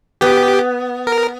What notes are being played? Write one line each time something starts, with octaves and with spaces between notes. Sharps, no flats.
B3 G4
A#4